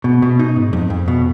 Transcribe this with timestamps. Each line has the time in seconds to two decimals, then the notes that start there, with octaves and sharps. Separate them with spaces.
0.04 B2
0.22 B2
0.39 D#4
0.56 G#2
0.73 F2
0.90 F2
1.08 B2